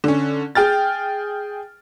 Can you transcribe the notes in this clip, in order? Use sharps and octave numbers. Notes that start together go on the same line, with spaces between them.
D3 C#4
G#4 G5 F6 A6